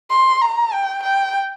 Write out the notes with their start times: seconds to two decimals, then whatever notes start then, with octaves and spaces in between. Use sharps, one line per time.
0.11 C6
0.42 A#5
0.74 G5
1.03 G5